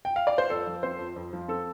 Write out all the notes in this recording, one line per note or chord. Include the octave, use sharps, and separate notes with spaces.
G5
F5
D5
C5
F2 A4
F3
C4 C5
F2
F2
F3
C4 A4